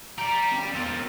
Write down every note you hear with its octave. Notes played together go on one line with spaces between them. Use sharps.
G4 D5 A#5
D#3 C4 C#4
C#2 B3 C4 F4 A#4